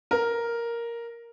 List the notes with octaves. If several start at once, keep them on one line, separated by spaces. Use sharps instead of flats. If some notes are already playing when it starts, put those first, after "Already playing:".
A#4